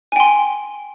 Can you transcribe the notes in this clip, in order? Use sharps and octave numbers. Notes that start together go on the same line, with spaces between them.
G5 G#5 C6